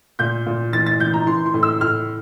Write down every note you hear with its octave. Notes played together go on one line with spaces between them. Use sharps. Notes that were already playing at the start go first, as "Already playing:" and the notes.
A#2 G6
A#2
E3 A6
A6
E3 G6
A#5
E3 C6
C6
A2
E6
A2 F6